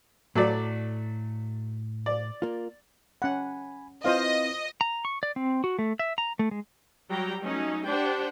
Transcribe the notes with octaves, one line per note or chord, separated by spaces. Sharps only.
A2 F#3 A3 D5
D5
A#3 F4
C#4 F#5 G#5 B5
C4 E4 F4 B4 C5 D#5 F5
A#5
C#6
D5
C4
F#4
A3
E5
A#5
A3
G#3
F#3 G3 G5 A#5
F#3 A3 C#4 D#4
D4 G4 C5 D5 F#5 G5